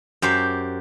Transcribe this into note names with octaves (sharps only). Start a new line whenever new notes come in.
F#2 G4 C5